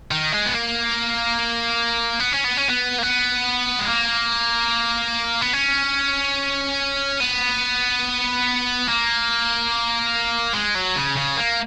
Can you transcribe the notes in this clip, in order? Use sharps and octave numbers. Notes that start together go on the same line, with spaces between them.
D#3
G#3
B3
A#3
B3
C#4
B3
C#4
B3
A#3
B3
G#3
A#3
B3
C#4
B3
A#3
G#3
F#3
C#3
C#3
A#3